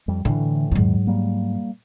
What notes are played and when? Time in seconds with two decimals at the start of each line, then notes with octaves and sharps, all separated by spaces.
0.08 F2 G3
0.25 A2 D3 E3
0.72 E2 G#2 D#3 F#3
1.07 G3 A#3